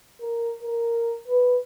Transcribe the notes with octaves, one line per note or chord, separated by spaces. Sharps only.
A#4
A#4
B4